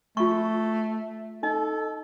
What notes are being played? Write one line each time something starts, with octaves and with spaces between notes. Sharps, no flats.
A3 F4 C#6
D#4 A4 D#5